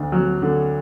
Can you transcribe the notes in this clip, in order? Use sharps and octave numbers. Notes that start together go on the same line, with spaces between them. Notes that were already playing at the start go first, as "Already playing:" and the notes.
Already playing: D2 D4
F#3
D3